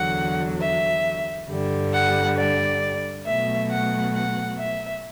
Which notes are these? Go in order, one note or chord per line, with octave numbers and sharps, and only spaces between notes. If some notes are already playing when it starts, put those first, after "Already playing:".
Already playing: E2 D3 F#3 F#5
E5
G2 D3 G3
F#5
D5
B2 F#3 A3 E5
F#5
F#5
E5